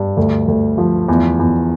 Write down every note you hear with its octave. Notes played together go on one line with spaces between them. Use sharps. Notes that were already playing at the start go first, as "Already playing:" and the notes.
Already playing: G2
D2
D2
F3
E2
E2